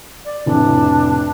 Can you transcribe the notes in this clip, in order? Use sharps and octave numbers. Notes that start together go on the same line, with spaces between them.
D5
F1 A2 C3 D4